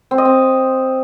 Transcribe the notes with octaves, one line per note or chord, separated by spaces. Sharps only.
C4
D#5
C4